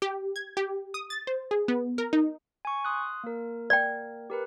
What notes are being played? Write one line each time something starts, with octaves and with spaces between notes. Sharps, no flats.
G4
G#6
G4
D#6
A6
C5
G#4
B3
A#4
D#4
G#5 C#6
C6 D#6 F#6
A#3 A#4
D5 G5
G4 A#4 B4